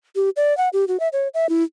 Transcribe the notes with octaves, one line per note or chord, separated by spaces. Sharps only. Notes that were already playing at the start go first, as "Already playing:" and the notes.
G4
D5
F#5
G4
F#4
E5
C#5
E5
E4